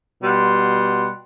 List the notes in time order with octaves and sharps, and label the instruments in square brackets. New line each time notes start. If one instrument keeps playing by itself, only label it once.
[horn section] B2 G3 F#5 C6